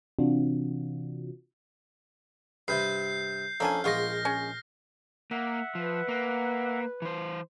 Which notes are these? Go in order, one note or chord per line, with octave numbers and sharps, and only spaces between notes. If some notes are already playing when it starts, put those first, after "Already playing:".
C3 E3 C4 D4 F4 F#4
G2 C3 B4 G6 C7
F2 A#3 C#4 D4 G#5
A#1 G#3 B3 F4 C#6 F6 A#6
C#4
A#3 E5 F#5
F3 B4
A#3
E3 C5